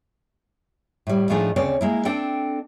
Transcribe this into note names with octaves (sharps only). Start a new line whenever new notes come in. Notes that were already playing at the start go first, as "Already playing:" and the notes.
A2 G3
A2 F3 A3 D4 D#4 G#4
D2 C#3 C4 C#5 D5
G#3 A#3 E4
C4 D4 A4 G5